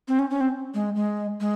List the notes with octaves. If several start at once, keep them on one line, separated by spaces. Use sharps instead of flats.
C4
C#4
C#4
C4
G#3
G#3
G#3